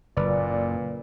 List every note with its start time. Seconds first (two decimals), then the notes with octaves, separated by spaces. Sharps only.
0.17 F#1 A#2 B4 D5